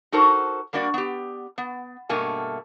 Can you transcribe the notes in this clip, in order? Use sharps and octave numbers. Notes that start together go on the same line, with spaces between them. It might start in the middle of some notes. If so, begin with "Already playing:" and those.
D#4 F#4 A4 A#4 C5
G3 A#3 D4 F#4 D5
B3 G4
B3
G2 B2 A3 A#3 G#5